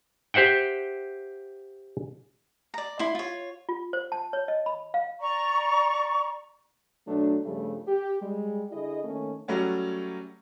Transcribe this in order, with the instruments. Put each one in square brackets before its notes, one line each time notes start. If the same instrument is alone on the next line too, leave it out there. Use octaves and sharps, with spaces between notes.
[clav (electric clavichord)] G4 C5 E5 F#5 G5
[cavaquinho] D5 A#5
E4 C6
F4 C#5
[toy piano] F4
C5
A5
C#5
D#5
B5
F5
[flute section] D5 A#5 C#6
[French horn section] B2 F#3 A3 D4
G2 C#3 F3 G3 A3
G4
G3 G#3
D3 E4 G#4 D#5
D#3 A3 A#3 C#4
[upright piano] F#3 G3 A3 C#4 F#4